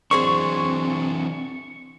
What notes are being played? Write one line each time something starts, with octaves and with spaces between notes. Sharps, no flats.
E3 F#3 C4 D4 G#4 C5 C#5 C#6